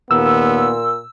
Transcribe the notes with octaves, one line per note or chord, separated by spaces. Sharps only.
D#2 A#2 B3 E6